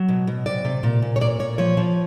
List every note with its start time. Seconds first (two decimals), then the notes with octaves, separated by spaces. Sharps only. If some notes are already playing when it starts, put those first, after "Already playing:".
Already playing: F#3
0.08 B2
0.27 B2
0.46 C3 D5
0.65 C3
0.83 A#2
1.02 A#2
1.16 C#5
1.21 A#2 D5
1.39 A#2 C#5
1.58 F3 C#5
1.77 F3